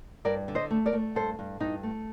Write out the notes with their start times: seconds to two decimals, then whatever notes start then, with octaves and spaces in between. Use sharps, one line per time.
0.25 G2 A#4 D5
0.48 D3
0.55 C5 D#5
0.71 A3
0.86 A#4 D5
0.93 A3
1.15 G2 A4 C5
1.39 G2
1.60 G2 D#4
1.83 A3